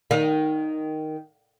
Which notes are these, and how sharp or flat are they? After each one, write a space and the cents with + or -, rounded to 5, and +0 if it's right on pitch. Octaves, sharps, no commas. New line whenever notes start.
D#3 +0 F5 +40